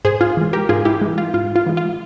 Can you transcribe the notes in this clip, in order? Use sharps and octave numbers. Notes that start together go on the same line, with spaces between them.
G#2 G#4 C5
F4 G#4
E3 G#3
G4 A#4
G#2 F4 G#4
E4 G4
E3 G#3
F4
G#2 F4
F4
E3 G#3
F4